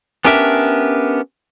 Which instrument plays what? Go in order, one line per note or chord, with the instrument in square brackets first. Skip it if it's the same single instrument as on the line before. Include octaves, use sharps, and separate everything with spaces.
[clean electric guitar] B3 C#4 D4 G4 A#4 E5